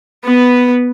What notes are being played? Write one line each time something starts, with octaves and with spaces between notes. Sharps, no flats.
B3 B4